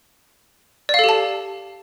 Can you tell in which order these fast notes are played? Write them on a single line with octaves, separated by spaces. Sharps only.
D5 F5 A4 G4 A5